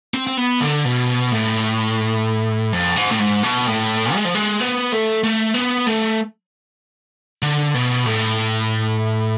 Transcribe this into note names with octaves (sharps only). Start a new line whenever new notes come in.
C4
C4
B3
D3
B2
A2
F2
G#2
A2
G#2
B2
A2
G#3
F3
G#3
B3
A3
A3
B3
A3
D3
B2
A2